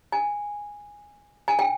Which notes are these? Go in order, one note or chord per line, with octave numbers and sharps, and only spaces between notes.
G#5
G#5
G5